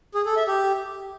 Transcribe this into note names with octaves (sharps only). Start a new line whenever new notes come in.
G#4
A4
E5
G4